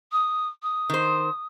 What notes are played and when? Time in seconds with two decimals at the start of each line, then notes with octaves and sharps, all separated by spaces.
0.12 D#6
0.62 D#6
0.90 D#3 C5